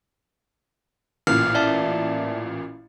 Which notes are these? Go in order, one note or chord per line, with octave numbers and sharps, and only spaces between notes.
A1 A#2 F6
D5 E5 A5